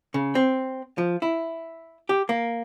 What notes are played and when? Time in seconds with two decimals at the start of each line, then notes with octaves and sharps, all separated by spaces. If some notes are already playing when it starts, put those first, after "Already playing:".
0.14 C#3
0.35 C4
0.98 F3
1.22 E4
2.09 G4
2.29 A#3